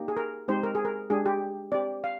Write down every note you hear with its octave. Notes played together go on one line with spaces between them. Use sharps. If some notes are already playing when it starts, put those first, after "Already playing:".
Already playing: A#3 D#4 G4
G#4
A#4
G#3 C4 D#4 G4 C5
A#4
G#4
A#4
G#3 D4 G4 G#4
G4
C4 G4 D5
F5